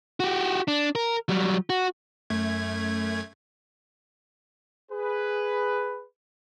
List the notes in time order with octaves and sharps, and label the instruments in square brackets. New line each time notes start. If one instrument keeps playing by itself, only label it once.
[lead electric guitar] F#4 G4
D4
A#4
F#3 G3
F#4
[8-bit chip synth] F#2 A3 G#6
[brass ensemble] G#4 B4